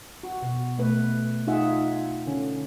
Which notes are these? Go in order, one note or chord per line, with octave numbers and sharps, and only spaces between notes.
F#4
B2
B2 A3 B4
D#4 F4 G#4 E5 F#5
D3 C#4